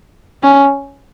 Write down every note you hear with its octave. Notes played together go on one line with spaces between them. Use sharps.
C#4